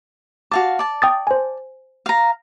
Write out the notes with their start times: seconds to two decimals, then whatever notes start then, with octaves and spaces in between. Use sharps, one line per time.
0.52 F#4 F5 A5 D6
0.79 D5 A5
1.02 G5 D#6 A6
1.27 C5 G#5
2.06 F5 A#5